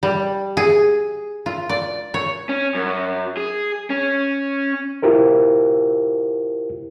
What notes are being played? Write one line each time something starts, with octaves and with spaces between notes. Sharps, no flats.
G3
G#4
F4
D5
C#5
C#4
F#2
G#4
C#4
E4 F4 G4 A#4 C5